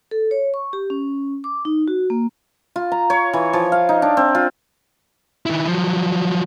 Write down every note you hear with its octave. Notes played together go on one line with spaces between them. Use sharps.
A4
C#5
C#6
G4
C#4
D6
D#4
F#4
A#3
F4
A#5
C#5
E3
F3
F5
D#4
D4
C4
F4
D#3 E4
F3 F#3